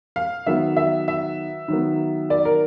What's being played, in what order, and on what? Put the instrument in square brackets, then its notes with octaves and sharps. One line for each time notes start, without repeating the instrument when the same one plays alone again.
[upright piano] F5
D#3 F#3 B3 E5
E5
E5
D#3 F#3 B3
D5
A#4